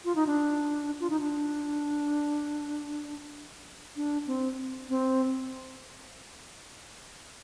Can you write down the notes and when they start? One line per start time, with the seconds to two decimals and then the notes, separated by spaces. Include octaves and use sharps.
0.05 F4
0.15 D#4
0.27 D4
1.00 F4
1.10 D#4
1.20 D4
3.97 D4
4.27 C4
4.89 C4